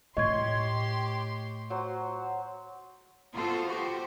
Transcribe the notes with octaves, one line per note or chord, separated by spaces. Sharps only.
A2 A3 G4 C#5 D#5 C6 G#6
F#3 C5
B3 F4 F#4 A4 C5
F#4 G4 C5